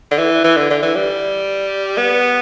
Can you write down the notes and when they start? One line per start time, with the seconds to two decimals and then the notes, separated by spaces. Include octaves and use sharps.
0.11 D3
0.18 E3
0.44 E3
0.57 D3
0.70 D3
0.83 E3
0.96 G3
1.98 B3